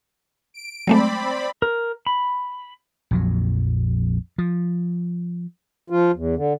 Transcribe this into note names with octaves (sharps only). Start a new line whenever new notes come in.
D7
F#3 G#3 A3 C4 D5 B5
A#4
B5
A#1 F2 F#3
F3
F3 F4
E2
D3